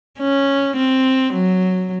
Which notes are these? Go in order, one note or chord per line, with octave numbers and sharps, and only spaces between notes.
C#4
C4
F#3